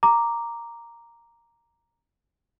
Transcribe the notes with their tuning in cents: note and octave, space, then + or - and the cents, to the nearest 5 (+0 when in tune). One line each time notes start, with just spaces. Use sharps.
A#5 +0 D6 +0